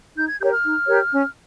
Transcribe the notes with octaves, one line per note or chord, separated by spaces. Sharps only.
D#4 G6
G#6
G4 A#4 C#5 G6
F6
D#4
G4 A#4 C#5
C#4